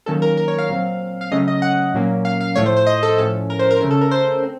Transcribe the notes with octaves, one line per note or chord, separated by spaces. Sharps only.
D#3 F#3 A#3 C#4 A4
A#4
A#4
C#5
F5
A#2 F#3 C4
F5
C#3 F#3 A3 C#4 D#5
D#5
F#5
A#2 F#3 A#3 C#4
F5
F5
A2 F3 A3 C#5
C5
C5
D#5
A4
A2 F3 A3 C#4 A4
A#4
C5
A#4
C#3 A3 C#4 A#4
A4
A#4
C5
C4